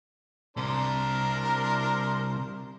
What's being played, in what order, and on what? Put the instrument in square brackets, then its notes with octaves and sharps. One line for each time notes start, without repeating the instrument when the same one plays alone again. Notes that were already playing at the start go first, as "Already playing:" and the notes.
[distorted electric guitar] C2 C3 [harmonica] D4 A#4 C5